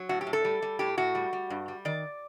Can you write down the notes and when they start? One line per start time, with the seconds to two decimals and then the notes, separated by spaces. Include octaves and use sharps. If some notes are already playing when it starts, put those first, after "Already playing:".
Already playing: F#3
0.09 A2 F#4
0.21 G4
0.27 A2
0.33 A4
0.45 G3
0.62 G3
0.79 A2 G4
0.98 A2 F#4
1.15 G3
1.33 G3
1.50 G2
1.68 G3
1.85 D#3 D5